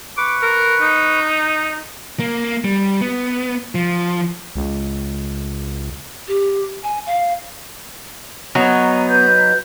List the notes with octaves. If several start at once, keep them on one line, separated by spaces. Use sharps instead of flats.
B4 C#6 D6
A#4
D#4
A#3
G3
B3
F3
C#2
G4
G#5
F5
F#3 B3 D#4
B4 G6